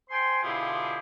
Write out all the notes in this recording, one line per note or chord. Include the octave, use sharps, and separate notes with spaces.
C5 G5 G#5 C6
B2 D3 E4 F4 G4 G#4